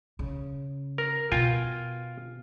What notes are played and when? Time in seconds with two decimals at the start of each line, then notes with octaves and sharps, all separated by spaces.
0.19 C#3
0.98 A#4
1.32 B2 F4 G5 G#5